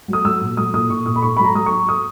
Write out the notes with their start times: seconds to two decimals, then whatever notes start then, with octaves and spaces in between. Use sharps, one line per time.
0.08 F#3
0.13 D#6
0.25 F#3 E6
0.41 A#2
0.57 F#3 D#6
0.74 A#2 D#6
0.89 A#2 C#6
1.06 A#2 D#6
1.16 B5
1.22 G#2 C#6
1.37 F#3 B5
1.44 A#5
1.55 F#3 D#6
1.66 C#6
1.72 G#2
1.89 D#6